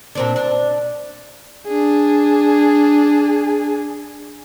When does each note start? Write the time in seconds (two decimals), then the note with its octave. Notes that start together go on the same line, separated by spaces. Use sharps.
0.15 A#2 C4 D4
0.36 D4
1.67 D4 G#4